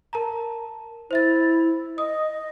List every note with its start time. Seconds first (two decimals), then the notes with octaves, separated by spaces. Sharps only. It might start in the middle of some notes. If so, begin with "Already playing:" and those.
0.13 A#4 A5 A#5
1.11 E4 C5 E5 A6
1.98 D#5 D#6